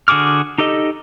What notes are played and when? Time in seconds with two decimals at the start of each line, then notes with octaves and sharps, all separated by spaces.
0.08 D3 F#4 G#4 D6 F6
0.58 D#4 G4 A4 D#5